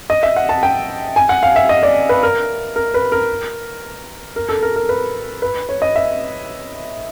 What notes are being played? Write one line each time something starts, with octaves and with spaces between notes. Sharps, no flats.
D#5
E5
F#5
A5
G5
G#5
F#5
F5
E5
D#5
D5
B4
A#4
A#4
B4
A#4
A#4
A4
A#4
A#4
B4
B4
C#5
D#5
E5